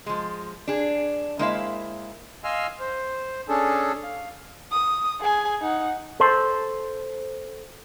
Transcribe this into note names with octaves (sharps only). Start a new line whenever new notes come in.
F3 G#3
D4 G#4
G#3 A#3 E4 C5 E5 F5
D#5 F5 G#5 C6 E6 F6
C5
C#4 D4 G#4 A4
F5
D#6
G#4 G#5
D#4 F#5
A4 C5